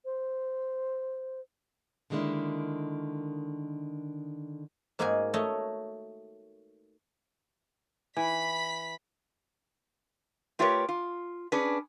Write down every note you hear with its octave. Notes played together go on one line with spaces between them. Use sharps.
C5
D3 D#3 G#3 A#3 D4 E4
G#2 A#3 D#4 F#4 G#4 G#5
A3 C#5 D#5
E3 B5 B6
A3 F4 G4 A#4 B4 C#5
F4
C#4 D4 G#4 B4